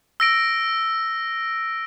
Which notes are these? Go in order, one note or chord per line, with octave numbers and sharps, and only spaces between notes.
E6 A#6 D7